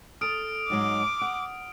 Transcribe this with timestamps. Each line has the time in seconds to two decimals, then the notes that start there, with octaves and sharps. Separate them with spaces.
0.21 A4 A5 D#6 F6 D7
0.70 G#2 F#3 G#3 D6
1.21 F#5